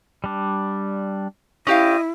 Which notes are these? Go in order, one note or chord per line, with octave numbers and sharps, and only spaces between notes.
G3 D4
C#4 E4 G4 D#5 F5